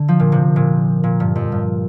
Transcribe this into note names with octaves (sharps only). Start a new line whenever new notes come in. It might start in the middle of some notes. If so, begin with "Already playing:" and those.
Already playing: D3
F3
A#2
C3
A#2
A#2
G2
F2
G2